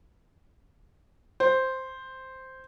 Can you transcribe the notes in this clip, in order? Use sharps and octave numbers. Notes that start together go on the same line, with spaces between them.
C5